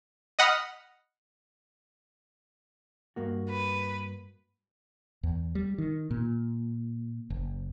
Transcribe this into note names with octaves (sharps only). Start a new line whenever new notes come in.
D#5 F#5 B5 D#6 F6
G2 A#3 F#4
B4
E2
G3
D#3
A#2
F#1